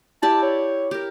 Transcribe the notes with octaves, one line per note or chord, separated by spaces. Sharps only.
E4 G4 D5 A5
C#5
G4 A#4